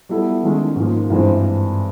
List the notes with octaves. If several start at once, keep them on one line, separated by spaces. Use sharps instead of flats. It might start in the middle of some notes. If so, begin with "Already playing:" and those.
G3 B3 E4 A4
D#3 G#3 C#4
G#2 F3 A#3
G2 E3 G#3 C4